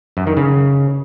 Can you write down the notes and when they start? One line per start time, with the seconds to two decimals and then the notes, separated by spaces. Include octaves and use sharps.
0.17 F#2
0.27 D#3
0.37 C#3